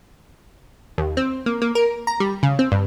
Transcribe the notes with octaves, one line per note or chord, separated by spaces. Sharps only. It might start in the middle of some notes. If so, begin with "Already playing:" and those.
D#2
C4
A#3
A#3
A#4
A#5
G3
C#3
C4
G2